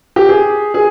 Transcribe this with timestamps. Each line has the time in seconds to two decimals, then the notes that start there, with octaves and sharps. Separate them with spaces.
0.16 G4
0.29 G#4
0.74 G#4